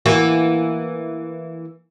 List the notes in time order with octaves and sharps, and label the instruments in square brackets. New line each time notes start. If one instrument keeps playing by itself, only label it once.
[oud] E3 A#3 F#4